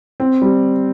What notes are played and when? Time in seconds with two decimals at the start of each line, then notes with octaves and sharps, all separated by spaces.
0.20 C4
0.42 G3